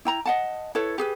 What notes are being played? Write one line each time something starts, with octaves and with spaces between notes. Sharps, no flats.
E4 G5 A#5
D#5 F#5 A5
E4 A4 B4 C#5
G4 G#4 B4